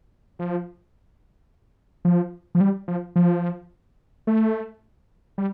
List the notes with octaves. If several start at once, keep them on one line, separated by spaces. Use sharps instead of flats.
F3
F3
F3
G3
F3
F3
A3
G3